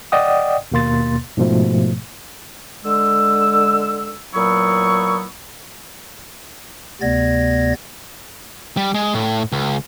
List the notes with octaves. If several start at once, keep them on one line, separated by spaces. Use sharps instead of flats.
D5 D#5 F#5 G5 D#6
D#2 B2 A#3 C6 A6
G#2 B2 F3 A3
D3 G#3 E6
A#2 F#3 B3 E4 C#6
D2 C3 B3 D5 G#6 A#6
G3
G#3
A2
C#2